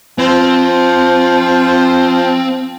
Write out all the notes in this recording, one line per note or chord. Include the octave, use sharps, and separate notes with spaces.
F3 C4